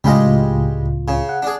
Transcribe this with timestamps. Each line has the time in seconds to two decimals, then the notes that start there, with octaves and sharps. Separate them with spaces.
0.04 C#2 A2 G3 G#3 F4 D#5
1.08 C#3
1.29 F#5
1.42 D4 G#4